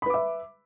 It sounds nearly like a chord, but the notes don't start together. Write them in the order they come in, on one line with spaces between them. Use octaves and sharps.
B5 B4 D6 E5